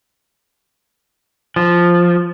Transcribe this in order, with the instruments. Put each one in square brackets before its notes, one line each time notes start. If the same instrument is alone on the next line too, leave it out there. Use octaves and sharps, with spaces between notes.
[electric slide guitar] F3